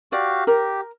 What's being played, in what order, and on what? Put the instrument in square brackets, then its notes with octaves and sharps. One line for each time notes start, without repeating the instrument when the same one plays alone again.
[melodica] F#4 G4 F5 [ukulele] D5
[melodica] G4 [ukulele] A#4